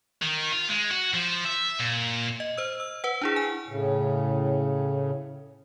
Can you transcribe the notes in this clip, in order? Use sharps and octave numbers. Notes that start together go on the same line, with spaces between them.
D#3
F4
G#3
F#4
F3
E5
A#2
D#5
C5 E6
E6
B4 F#5
D4 E4 G#4
G#5
A2 C#3